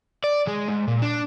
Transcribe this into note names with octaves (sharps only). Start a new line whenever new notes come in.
D5
G#3
G#2
A#2
D4